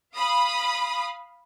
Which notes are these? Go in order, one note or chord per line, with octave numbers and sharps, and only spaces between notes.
F5 B5 D#6